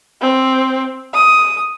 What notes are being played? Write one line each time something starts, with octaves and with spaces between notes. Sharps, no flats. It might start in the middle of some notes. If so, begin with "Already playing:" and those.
C4
D#6